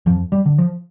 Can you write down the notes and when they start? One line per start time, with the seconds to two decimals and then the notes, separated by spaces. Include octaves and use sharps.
0.06 F2 F3
0.32 G3
0.46 D3
0.58 F3